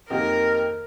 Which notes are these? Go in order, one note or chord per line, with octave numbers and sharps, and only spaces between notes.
F2 D#3 A#3 G4 A#4 D#5